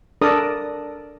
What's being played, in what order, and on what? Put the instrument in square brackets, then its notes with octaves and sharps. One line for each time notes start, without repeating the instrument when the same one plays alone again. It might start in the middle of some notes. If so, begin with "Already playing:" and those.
[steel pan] D4 A4 A#4 D5 D#6